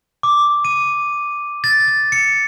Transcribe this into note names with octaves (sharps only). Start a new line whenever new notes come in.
D6
D#7
A6
A6
C#7